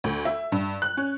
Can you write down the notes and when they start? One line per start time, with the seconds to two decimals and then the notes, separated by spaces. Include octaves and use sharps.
0.04 D2
0.25 E5
0.52 G2
0.82 F#6
0.97 C#4